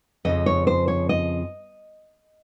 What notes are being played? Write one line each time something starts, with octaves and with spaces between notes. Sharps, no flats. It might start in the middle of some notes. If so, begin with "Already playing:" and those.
F2 C#3 F3 D#5
C#5
C5
C#5
D#5